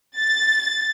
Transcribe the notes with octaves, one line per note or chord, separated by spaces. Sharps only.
A6